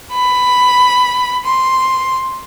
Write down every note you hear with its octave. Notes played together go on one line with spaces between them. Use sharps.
B5
C6